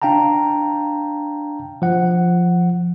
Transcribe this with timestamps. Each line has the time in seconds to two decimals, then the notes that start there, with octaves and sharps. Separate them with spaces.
0.02 D4 F5 G5 A5 A#5
1.82 F3 F#5